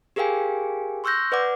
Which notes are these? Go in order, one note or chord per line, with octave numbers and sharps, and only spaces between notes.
G4 G#4 A#4 F5 G5 G#5
C6 C#6 E6 F#6 G6 A#6
B4 D5 F#5 D6